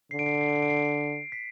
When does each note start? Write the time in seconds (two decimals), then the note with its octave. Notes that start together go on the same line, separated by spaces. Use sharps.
0.11 D3 C7
0.19 D7
0.26 C7
0.34 D7
0.41 C7
0.48 D7
0.55 C7
0.62 D7
0.69 C7
0.77 D7
0.85 C7
1.32 B6